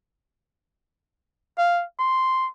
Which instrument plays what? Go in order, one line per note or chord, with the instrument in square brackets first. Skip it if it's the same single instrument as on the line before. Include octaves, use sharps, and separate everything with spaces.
[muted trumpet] F5
C6